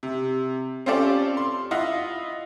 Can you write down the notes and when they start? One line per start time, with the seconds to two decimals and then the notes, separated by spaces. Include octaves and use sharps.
0.03 C3
0.86 C4 C#4 F4 G4 A4 D5
1.37 C6
1.71 E4 F4 D#5 F#5